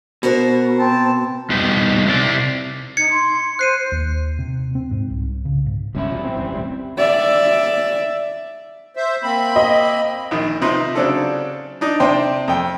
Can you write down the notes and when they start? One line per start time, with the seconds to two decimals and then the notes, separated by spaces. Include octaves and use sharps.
0.23 B2 F#4 A#4 C5
0.78 C4 A5
1.50 F2 B2 G3 D#4 B4
2.06 C3 E4 D5
2.97 D#4 G#6 C#7
3.10 C6
3.59 C5 F#6 C7 D#7
3.92 D#2
4.39 C3
4.75 C4
4.91 G#2
5.10 C2
5.45 C#3
5.66 G#2
5.95 G1 C#2 C3 C#4 E4
6.10 B2 F3 G3
6.24 C4
6.36 G#1 F2 E3
6.52 E1 A1 G3
6.98 D5 E5
8.96 C5 E5
9.23 A#3 C4 B5
9.56 D#5
10.31 A#1 D#3
10.61 C3 F3 D#4 B4 C6
10.95 C#3 F#3 C4 D4 A4
11.81 D4 D#4
12.00 C3 D4 C5 G5 C6
12.48 F2 G5